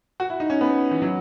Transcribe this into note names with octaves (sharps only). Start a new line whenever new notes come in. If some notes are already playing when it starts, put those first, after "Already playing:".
F#4
E4
D#4
C#4
B3
E3
F#3